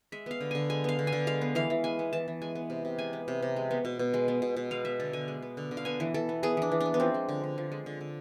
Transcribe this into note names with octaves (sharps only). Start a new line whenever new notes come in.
G#3 E5
B3 F5
D3
D3 G#5
G#3 G#5
B3 F5
D3
G#5
D3
G#3 F5
B3
E3 F5
E3
G#3 G#5
B3
E3 A5
E3
G#3 G#5
B3
C3
C3
G#3 G#5
B3
C3
C3
G#3
B3
B2
B2
G#3
B3
B2
B2
G#3 F5
B3 E5
D3 A4
D3 G#5
G#3
B3
D3
D3
F5
B3 G#5
E3
E3 A4
B3
B3 G#4
E3 D4
E3
B3 D4
B3
F3 C4
G#3
D3
D3
F3
G#3
D3
D3